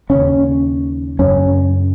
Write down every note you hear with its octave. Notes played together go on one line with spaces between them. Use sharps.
D#2 C#3 C#4
F#2 C#3 C#4